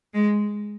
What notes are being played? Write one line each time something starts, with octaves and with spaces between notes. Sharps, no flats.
G#3